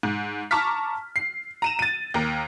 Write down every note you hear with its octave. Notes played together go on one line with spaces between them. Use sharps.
G#2
A5 A#5 C#6 D6 F6 B6
C7
A#5 D#7 E7
A6 D#7
D#2 A#4